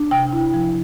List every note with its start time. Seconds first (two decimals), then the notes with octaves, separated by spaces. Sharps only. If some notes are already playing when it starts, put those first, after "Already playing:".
Already playing: D4
0.11 C3 G5
0.33 E4
0.54 F3